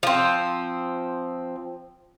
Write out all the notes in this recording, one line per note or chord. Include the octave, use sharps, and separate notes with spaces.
F3 C4